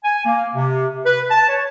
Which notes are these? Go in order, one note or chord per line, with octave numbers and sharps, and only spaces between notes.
G#5
A#3
C3
B4
A5
C#5